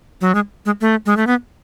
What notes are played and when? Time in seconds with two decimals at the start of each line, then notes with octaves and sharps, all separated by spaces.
0.21 F#3
0.35 G#3
0.66 G#3
0.81 A3
1.06 G#3
1.17 A3
1.27 B3